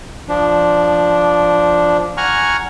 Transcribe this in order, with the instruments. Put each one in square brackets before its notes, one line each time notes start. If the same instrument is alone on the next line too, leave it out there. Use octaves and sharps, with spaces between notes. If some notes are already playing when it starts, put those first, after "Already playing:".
[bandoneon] F3 D4
F#5 G#5 A#5 C#6 F6